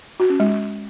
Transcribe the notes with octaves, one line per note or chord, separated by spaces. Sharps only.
F#4
C#4
G#3